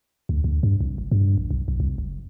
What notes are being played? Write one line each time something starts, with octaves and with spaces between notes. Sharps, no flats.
D2
D2
G2
C2
F#1
G2
A1
B1
B1
C2
F#1